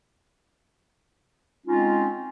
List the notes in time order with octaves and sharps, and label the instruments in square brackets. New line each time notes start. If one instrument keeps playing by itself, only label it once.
[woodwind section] G#3 C4 C#4 D#4 F4